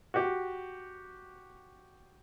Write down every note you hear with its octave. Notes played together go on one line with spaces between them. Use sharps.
F#4 G4